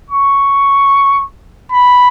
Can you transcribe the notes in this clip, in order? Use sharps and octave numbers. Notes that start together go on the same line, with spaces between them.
C#6
B5